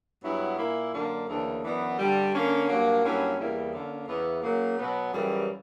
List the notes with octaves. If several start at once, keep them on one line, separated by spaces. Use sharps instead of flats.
G2 F#3 B3 E4
A#2 A#3 E4
F#2 D3 A#3 D4
D2 C#3 E3 A#3 D4
F#2 E3 B3 D4
G2 D3 G3
D3 A#3 C#4
G2 F#3 A#3
G2 F#3 A#3 C#4 E4
E2 C#3 G3 A#3 E4
D3 A#3 C#4
E2 C#3 E3 B3 E4
C#3 F#3 A#3
B2 F#3 B3
F#2 C#3 E3 G3